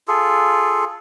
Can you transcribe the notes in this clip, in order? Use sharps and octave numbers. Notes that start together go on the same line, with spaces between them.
F4 G#4 A4